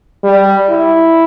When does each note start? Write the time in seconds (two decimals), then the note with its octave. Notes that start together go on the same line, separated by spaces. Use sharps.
0.24 G3
0.70 E4